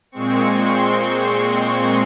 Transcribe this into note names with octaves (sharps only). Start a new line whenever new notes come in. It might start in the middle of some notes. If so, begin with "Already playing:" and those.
A#2 G#3 C4 C#6
C6
C#6